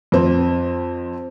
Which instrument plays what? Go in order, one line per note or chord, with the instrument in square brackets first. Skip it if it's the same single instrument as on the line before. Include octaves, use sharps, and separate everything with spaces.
[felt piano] F2 C4